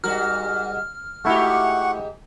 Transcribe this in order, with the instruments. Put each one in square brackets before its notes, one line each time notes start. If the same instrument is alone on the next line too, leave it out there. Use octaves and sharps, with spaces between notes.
[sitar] G#2 G3 F#4 [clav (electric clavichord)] A#4 [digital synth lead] F6
[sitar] G#2 G4 [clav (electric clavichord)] A3 E4 F#4 [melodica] F#5 C#6